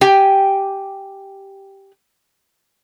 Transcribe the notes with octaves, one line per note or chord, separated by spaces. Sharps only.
G4 G5 G#5